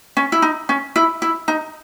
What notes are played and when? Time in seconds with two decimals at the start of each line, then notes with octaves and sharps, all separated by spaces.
0.17 C#4
0.32 E4
0.42 D#4
0.69 C#4
0.96 E4
1.22 E4
1.48 D#4